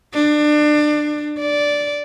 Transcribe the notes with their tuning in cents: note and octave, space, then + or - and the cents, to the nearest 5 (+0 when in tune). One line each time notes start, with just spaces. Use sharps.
D4 +25
D5 -10